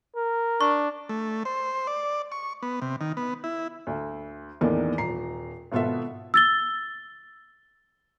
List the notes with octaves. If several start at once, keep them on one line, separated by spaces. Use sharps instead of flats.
A#4
D4 C#6
A3
C5
D5
C#6
B3
C3
D#3
B3
E4
D2
E2 A2 D#3 E3 A#3 D4
D#1 A#5 C7
G#1 B2 B3 F4 A4 E5
E6 A6 G7